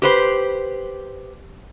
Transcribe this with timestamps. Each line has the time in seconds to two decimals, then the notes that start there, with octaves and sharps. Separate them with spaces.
0.02 G4 B4 C5